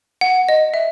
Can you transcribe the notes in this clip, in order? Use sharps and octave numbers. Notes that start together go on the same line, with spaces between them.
F#5
D#5
E5